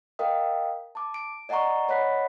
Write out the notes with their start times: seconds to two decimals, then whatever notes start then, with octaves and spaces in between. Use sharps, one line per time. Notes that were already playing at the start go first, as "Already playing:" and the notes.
0.19 A#4 D#5 F5 G5 D#6
0.95 A5 D6
1.14 D7
1.49 D5 D#5 F#5 G#5 A#5 C#6
1.89 C#5 D#5 F#5 B5 F#6 B6